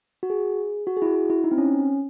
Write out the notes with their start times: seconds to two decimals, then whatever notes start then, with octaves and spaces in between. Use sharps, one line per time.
0.23 F#4
0.30 G#4
0.87 F#4
0.97 G#4
1.02 E4
1.06 F#4
1.15 E4
1.30 E4
1.44 D#4
1.51 C4
1.58 C#4